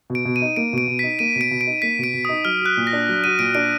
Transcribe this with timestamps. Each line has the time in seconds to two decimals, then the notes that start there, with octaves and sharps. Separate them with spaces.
0.10 B2
0.15 D7
0.25 B2
0.36 D#7
0.42 D#4
0.56 A#3 D7
0.73 B2 D7
0.88 B2
0.99 D#4 B6
1.19 A#3 D#7
1.36 B2
1.41 D7
1.51 B2
1.61 D7
1.67 D#4
1.82 A#3 B6
1.99 B2 D7
2.14 B2
2.25 D#4 D#6
2.45 F#3 F6
2.62 F#4 F#6
2.77 A#2
2.87 A#6
2.93 D4
3.09 F#3
3.24 F#4 D#7
3.39 A#2 D7
3.55 D4 D7